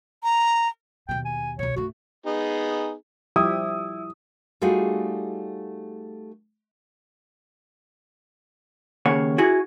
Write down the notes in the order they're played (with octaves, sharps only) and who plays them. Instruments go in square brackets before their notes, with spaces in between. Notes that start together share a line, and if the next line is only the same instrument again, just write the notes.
[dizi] A#5
[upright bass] D#2 B2 [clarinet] G5
[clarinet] G#5
[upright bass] C#2 B2 [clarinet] C#5
[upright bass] G2 A3 [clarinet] F#4
[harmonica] B3 D#4 G#4
[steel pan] F3 G3 G4 [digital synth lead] E4 [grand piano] D#6
[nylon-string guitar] G3 A3 D#4 F4 F#4 G#4
[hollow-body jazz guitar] D#2 C#3 A#3 C#5 F#5
E4 F#4 G#4